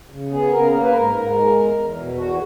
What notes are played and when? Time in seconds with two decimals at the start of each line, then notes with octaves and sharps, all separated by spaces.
0.10 C#3
0.31 B3 G#4
0.51 C#3 A#4
0.71 A#3 A#4
0.82 B4
0.92 G#2 A#4
1.13 G#2
1.34 G#3
1.55 E2
1.76 E2
1.96 B2
2.17 E2 F#4